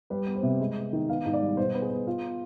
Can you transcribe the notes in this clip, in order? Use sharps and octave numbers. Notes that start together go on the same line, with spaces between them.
G3 B4
B3
C5
C3
G#3
B3
D#3
B3 F5
G#2
D5
G3
B2 C5
B3
G#4
B3
B3 F4